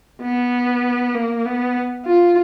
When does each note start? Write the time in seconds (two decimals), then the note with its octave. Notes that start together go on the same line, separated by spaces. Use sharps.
0.22 B3
1.15 A#3
1.46 B3
2.06 F4